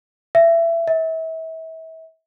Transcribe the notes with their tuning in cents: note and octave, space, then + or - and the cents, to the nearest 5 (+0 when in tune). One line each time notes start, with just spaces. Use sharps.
E5 +25
E5 -35